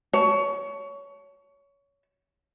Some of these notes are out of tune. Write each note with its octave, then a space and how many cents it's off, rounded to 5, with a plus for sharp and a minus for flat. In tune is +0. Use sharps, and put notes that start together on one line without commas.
C#5 +20 A5 +0